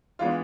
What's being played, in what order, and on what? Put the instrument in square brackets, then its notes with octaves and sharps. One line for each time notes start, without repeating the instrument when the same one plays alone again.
[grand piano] E3 G#3 B3 D4 [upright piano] F4